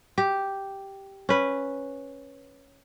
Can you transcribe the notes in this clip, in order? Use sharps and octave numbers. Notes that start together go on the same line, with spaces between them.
G4
C#4 B4